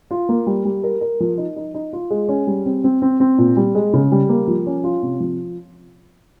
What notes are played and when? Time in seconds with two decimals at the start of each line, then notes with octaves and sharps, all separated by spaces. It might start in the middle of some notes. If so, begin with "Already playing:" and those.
0.11 F4
0.29 A#3
0.47 G3
0.65 G3
0.83 A#4
1.01 A#4
1.20 F3
1.38 D#4
1.56 D#4
1.74 D#4
1.93 F4
2.10 G#3
2.29 C#4
2.47 G3
2.66 C4
2.84 C4
3.02 C4
3.20 C4
3.38 A#2
3.56 G3
3.75 G#3
3.93 C#3
4.12 G3
4.29 A#3
4.47 F3
4.66 C#4
4.84 F4
5.02 C3
5.20 F3